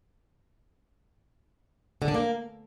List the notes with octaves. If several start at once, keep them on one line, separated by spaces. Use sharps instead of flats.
D3
D4
A#3